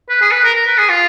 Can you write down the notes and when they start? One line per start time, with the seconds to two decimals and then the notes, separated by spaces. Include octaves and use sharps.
0.09 B4
0.21 G#4
0.32 B4
0.44 A#4
0.55 A#4
0.67 B4
0.78 G#4
0.89 F4